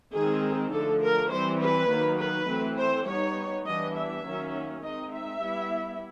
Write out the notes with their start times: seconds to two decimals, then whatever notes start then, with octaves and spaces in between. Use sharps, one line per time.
0.13 D#3 G#3 C4 D#4 G#4
0.71 D3 F3 A3 A4
1.02 A#4
1.30 E3 G3 C4 C5
1.60 B4
1.89 D#3 F#3 A#3 D#4
2.19 B4
2.48 E3 A3 C4
2.78 C5
3.06 G3 B3 D#4 C#5
3.66 E3 G3 B3 D4 D#5
3.95 E5
4.25 D#3 F#3 A#3 C#4
4.82 G#3 C4 D#4 D#5
5.12 E5
5.42 G3 B3 E4